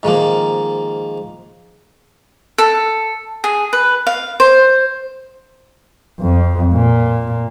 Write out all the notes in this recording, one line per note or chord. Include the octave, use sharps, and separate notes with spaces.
G#2 D#3 F3 A#3
A4
G#4
B4
F5
C5
F2
A#2